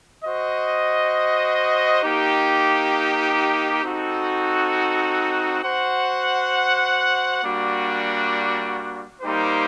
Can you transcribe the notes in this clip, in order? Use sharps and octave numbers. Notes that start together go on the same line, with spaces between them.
F#4 C5 D#5
A#3 D#4 G4
C4 D#4 F#4 A4
F#4 C5 F#5
G3 A#3 D4 F#4
G3 A#3 D#4 G4 C5